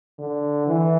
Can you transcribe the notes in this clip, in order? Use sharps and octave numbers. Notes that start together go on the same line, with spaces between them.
D3
E3